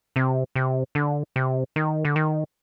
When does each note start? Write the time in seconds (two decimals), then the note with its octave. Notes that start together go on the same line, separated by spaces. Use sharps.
0.16 C3
0.56 C3
0.95 D3
1.36 C3
1.76 D#3
2.05 D3
2.16 D#3